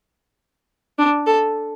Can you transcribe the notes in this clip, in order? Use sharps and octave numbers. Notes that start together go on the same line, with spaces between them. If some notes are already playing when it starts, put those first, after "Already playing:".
D4
A4